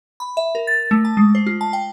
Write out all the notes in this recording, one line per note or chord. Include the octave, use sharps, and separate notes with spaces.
B5
E5
A#4
A6
A3
A5
G#3
C5
F4
A5
G5